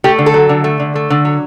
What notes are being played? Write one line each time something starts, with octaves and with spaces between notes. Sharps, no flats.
A3 G4
D3
A4
F#3
D3
A3
D3
A3
D3
F#3